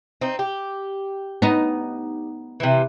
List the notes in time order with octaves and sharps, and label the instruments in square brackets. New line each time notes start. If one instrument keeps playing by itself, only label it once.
[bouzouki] C4 D#4
G4
[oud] B3 D#4
[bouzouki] C3 E3